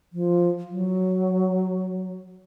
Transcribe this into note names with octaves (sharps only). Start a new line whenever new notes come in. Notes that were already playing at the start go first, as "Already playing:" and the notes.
F3
F#3